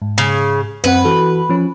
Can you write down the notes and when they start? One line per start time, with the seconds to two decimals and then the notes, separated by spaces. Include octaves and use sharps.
0.02 G#2
0.18 C#3
0.84 F#2 C4 B4 F#5
1.05 E3 F#4 A4
1.50 F3 C#4